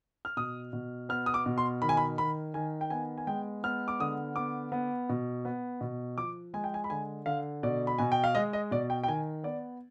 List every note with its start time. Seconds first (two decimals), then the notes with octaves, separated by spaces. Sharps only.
0.25 F6
0.37 B2 D#6
0.73 B2
1.09 B3 F6
1.26 D#6
1.34 D6
1.46 B2
1.58 C6
1.82 D#3 B5
1.89 G#5
1.97 B5
2.18 D#3 B5
2.54 D#3 G#5
2.81 G5
2.90 B3 G#5
3.18 G#5
3.27 G#3 G5
3.64 B3 F6
3.88 D6
4.00 D3 D#6
4.36 B3 D6
4.72 B3
5.09 B2
5.45 B3
5.81 B2
6.17 F3 D6
6.54 G#3 G#5
6.64 G5
6.74 G#5
6.84 B5
6.90 D3 G#5
7.26 D3 F5
7.63 B2 D5
7.87 B5
7.98 B2 G#5
8.12 G5
8.24 F5
8.35 G#3 D#5
8.53 D#5
8.71 B2 D5
8.90 G5
9.04 G5
9.08 D#3 G#5
9.44 B3 D5